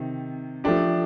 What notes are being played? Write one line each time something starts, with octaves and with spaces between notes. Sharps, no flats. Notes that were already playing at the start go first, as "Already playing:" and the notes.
Already playing: C3 D#3
F3 A3 D4 G4